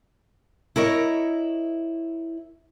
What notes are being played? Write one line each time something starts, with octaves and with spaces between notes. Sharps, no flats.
E4 A#4 C#5 D#5